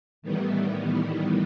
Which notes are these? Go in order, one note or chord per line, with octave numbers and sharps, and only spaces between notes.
A2 D#3 E3 G3 B3